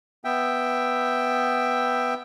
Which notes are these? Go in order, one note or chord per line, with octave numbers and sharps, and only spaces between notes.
B3 E5 G5